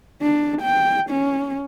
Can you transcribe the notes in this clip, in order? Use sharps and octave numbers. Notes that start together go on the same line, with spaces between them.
D4
G5
C#4